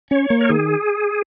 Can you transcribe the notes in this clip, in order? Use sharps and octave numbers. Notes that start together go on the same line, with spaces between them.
C#4 C#5
A#3
A#4
D#3 G#4